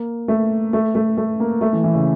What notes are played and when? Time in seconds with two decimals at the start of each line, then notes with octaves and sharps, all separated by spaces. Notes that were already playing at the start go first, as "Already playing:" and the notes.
Already playing: A#3
0.28 A3
0.73 A3
0.95 A3
1.17 A3
1.40 A#3
1.61 A3
1.73 E3
1.84 E3
1.95 C#3